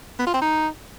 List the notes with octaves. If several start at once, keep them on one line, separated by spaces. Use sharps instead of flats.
B3
F4
C4
D#4